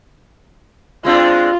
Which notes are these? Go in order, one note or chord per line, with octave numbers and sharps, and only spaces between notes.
G#3 C4 D4 F4